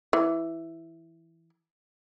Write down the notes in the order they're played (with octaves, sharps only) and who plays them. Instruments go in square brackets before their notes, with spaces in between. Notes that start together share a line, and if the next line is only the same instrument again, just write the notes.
[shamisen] E3